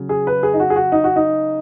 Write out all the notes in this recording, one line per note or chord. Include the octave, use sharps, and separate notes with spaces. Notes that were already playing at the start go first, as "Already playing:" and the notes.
Already playing: C#3 F#3
G#4
B4
G#4
D#4
F#4
G#4
F#4
D#4
F#4
D#4